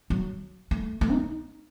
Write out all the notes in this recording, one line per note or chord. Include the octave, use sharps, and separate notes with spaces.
F#3
A3
A3
D#4